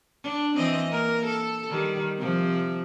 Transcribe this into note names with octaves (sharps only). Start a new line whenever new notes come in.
D4
E3 C4 D#5
A#3 A#4
A4
D#3 G3
C3 F3